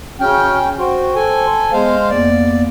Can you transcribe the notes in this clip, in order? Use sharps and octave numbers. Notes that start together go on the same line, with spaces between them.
C#3 C#4 F#4 G5 F6
F#4 C5 G5 C6
A4 G#5
G#3 B3 C5 F5
F2 A#3 B3 D5